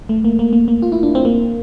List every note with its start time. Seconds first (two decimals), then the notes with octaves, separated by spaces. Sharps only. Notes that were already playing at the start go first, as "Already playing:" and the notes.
0.09 A3
0.24 A#3
0.39 A#3
0.53 A#3
0.68 A#3
0.82 F4
0.92 E4
1.03 D4
1.15 C4
1.25 A#3